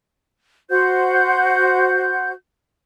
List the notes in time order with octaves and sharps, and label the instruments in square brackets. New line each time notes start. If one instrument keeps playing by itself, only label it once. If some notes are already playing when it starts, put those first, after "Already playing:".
[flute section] F#4 C5 F#5 G6